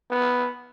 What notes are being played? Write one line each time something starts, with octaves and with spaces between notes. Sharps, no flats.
B3